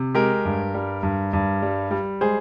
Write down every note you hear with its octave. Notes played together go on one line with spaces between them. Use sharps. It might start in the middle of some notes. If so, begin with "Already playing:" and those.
Already playing: C3
G#3 G4 A#4
G2
G3
G2
G2
G3
G3
G#3 G#4 C5